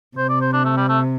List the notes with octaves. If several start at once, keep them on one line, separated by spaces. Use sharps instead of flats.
C3 C5
D5
C5
D4
A3
G3
A3